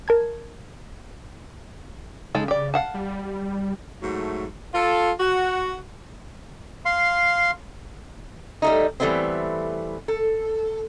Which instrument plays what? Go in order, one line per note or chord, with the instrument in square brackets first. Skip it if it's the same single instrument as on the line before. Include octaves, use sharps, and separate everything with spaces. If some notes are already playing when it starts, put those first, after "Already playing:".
[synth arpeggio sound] A#4 A5 G#6
[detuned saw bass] C#3 [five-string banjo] G#3 D#4 A4
[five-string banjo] G4 D5
F5 F#5 A5
[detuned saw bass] G3
[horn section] G#2 F#3 A3
F4 A4
F#4
[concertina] F5 C6
[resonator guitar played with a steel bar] G3 A3 D#4
E3 G3 A3 B3 C4
A4